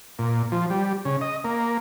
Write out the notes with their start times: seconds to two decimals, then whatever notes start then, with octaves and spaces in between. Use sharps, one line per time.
0.19 A#2
0.52 F3
0.70 G3
1.05 C#3
1.21 D#5
1.44 A#3